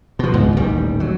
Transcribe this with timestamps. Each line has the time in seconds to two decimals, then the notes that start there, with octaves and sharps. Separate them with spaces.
0.19 B2 F3
0.34 C#2 G#2 B2
0.57 D#1 A1 D#3 G3
1.00 F#3